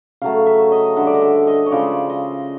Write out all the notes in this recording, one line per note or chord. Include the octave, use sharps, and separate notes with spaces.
C#3 F#3 A3 F5
E5
D#5
D3 G3 E5
D5
D#5
E5
D#5
C#5
C#3 F3 G#3 D5
D#5